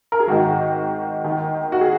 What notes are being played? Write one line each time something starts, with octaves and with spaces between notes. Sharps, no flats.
A#4
G#4
G#1 G#2 D#3 F#4
D#2 D#3
F#4
G#4